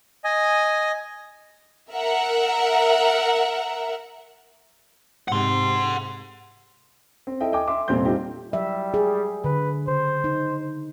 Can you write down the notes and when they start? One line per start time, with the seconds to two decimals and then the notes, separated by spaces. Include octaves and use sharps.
0.24 D#5 G#5
1.92 A#4 E5 F#5
5.28 G#2 C3 F#5 C6
7.27 C4
7.41 E4 A4 D#5 E5 G5
7.52 D#5 G5 G#5 D6
7.68 E5 C6 D6
7.88 F1 A#2 G3 C4 C6 G6
8.05 C4 D4 D#4 F4 G4
8.53 F#3 G3 E5
8.94 G#4
9.44 D3 B4
9.88 C#3 C5
10.24 D#4